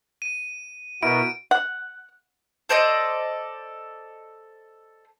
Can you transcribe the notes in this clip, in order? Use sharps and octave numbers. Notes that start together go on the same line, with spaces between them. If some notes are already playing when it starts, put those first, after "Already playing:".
D#7
B2 B3 E4 A#4 D7
F#5
A4 C5 D5 D#5